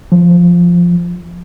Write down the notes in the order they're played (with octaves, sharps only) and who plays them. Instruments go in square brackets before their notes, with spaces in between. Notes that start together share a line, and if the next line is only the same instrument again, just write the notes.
[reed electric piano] F3